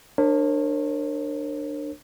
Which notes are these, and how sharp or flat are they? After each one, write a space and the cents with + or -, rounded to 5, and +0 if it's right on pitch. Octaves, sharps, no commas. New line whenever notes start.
D4 +15 A#4 +0 C#5 -40